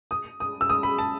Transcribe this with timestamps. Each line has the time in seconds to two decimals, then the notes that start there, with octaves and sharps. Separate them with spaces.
0.11 D#6
0.40 D#6
0.61 E6
0.70 D#6
0.83 B5
0.98 A5